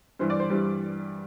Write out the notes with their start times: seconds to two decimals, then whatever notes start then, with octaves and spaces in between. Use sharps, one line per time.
0.19 G2 E3 G3 C5
0.30 D5
0.40 C5
0.50 G2 E3 G3 C5